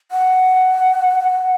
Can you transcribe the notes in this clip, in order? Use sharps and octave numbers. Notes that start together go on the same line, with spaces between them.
F#5